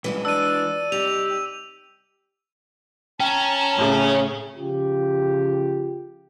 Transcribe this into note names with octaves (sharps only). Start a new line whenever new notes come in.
G2 E3 F#3 G#3 F#4
D4 D5 E6 D#7
C3 G3 D#4 G4 F7
C#4 G5 A5 A#5
A2 C#3
C#3 F3 F4 G4